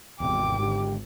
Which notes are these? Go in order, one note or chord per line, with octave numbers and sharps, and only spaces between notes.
G#1 E2 C3 G5 D6
G#2 D3 G4